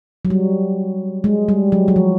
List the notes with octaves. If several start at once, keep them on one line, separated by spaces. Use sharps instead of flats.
F#3
G3
G#3
G3
F#3
F#3
F3